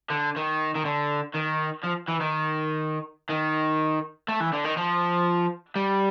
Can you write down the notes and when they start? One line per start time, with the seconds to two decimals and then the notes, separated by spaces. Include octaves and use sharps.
0.10 D3
0.36 D#3
0.75 D#3
0.85 D3
1.35 D#3
1.83 F3
2.08 E3
2.21 D#3
3.30 D#3
4.29 A3
4.40 E3
4.53 D3
4.65 D#3
4.77 F3
5.76 G3